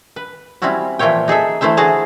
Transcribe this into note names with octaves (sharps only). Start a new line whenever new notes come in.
B4
G3 C4 C#4 E4 F#4
A#2 E3 F3 E4 C#5 G5
D#4 G#4 A4 E5
E3 A3 E4 C5 E5
D3 A3 F#4 G#4 A5 A#5